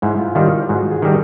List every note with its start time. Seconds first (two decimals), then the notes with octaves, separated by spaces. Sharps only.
0.02 G#2 E4
0.19 F4
0.35 D#3 G3 F4
0.69 G#2 F#4
0.91 G#4
1.02 D#3 G3 A#4